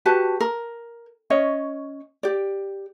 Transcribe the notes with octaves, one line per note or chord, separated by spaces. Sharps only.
F#4 G4 B4 A5
A#4
C#4 C#5 D#5
G4 D5